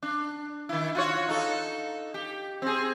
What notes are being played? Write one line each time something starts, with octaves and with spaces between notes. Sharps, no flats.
D4
D#3 E4
F4 F#4 C#5
D#4 A4
G4
C4 G#4